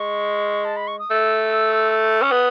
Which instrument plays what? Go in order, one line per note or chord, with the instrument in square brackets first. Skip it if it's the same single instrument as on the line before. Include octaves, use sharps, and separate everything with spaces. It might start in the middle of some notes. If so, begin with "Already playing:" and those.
Already playing: [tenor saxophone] G#3 [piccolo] C#6
[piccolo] A5
B5
C#6
D#6
[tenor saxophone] A3 [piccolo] E6
[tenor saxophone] C#4
[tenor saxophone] B3 [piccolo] D#6